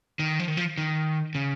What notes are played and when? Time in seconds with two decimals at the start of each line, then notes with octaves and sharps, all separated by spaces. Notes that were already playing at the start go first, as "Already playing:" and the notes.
0.19 D#3
0.39 F3
0.48 D#3
0.57 F3
0.78 D#3
1.35 C#3